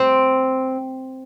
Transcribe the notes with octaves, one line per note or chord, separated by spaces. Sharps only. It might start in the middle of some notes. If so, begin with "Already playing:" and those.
Already playing: C4